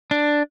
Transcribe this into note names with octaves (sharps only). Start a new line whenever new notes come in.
D4